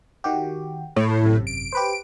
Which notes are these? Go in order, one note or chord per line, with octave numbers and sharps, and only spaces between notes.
D#3 F#4 G4
A2
G#1 F#2 C3
D7
G4 B4 C5